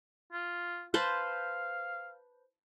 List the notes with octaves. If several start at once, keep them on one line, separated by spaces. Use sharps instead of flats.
F4
B4 C5 F5 A5